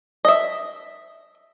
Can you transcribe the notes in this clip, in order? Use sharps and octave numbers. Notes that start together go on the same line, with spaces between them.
D#5 E5